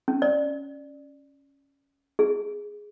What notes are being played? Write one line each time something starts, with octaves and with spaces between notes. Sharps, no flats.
C#4
D5
G#4